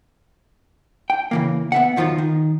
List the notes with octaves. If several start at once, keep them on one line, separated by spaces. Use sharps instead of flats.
G5
C#3 E3 A#3
B3 E5 F#5
E2 D#3 F3 F#3 F4
D#3